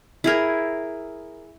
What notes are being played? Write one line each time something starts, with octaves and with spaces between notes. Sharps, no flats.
E4 G#4 A#4